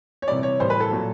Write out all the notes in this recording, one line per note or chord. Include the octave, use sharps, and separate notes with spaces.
C#5
C3 E3 G3 D5
C#5
A2 E3 G3 C5
B4
A4
A#2 F#3